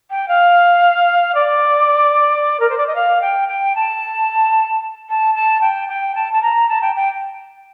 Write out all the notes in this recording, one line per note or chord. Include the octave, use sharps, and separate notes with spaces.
G5
F5
D5
A#4
C5
D5
D#5
F5
G5
G5
A5
A5
A5
G5
G5
A5
A5
A#5
A5
G5
G5